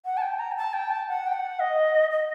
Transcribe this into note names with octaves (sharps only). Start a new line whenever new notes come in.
F#5
A5
G5
A#5
G5
A5
G5
A5
F#5
G5
F#5
D#5
D#5